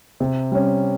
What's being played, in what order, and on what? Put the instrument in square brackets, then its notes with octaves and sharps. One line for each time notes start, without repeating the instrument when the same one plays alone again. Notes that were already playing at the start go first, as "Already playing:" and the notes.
[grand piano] C3
G3 C#4